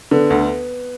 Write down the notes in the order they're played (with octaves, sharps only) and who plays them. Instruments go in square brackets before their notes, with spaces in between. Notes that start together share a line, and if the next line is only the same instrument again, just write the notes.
[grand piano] D3 [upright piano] B3
[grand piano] D2